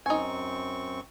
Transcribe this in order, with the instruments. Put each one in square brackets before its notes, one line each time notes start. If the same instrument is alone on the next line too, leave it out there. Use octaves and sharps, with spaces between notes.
[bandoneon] F#2 C4 C#6 [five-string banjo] D#4 G#5